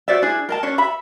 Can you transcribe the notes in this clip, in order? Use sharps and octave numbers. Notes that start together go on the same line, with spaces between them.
F#4 C5 D5 E5
D4 E4 G#4
A#4 D#5 A5
C#4 D4 C#5
E5 B5